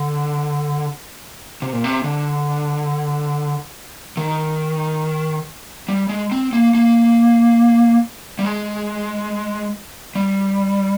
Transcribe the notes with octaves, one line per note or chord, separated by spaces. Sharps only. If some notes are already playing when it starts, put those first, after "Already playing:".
Already playing: D3
C3
A#2
C3
D3
D#3
G3
G#3
C4
A#3
A#3
G3
G#3
G3